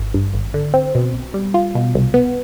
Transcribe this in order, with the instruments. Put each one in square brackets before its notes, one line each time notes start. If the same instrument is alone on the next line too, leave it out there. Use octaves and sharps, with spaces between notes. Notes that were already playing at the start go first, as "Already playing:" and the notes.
Already playing: [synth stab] G#1
G2
G#1
D3
C4
B2
B1
G3
F4
B2
C2
B3